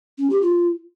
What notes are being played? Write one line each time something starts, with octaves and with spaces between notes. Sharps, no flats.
C#4
G4
F4